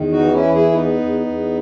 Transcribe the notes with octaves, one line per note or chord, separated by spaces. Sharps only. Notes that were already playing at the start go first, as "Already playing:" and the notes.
Already playing: E2 D#3
D#4 F#4
E3
C#4 E4
E2
E4 G#4
E2 B3 D#4
E2
E2